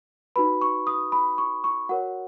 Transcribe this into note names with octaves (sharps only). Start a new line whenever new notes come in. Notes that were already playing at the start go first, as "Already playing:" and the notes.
D#4 F#4 B4 B5
C#6
D#6
B5
C#6
C#6
F#4 A#4 C#5 F#5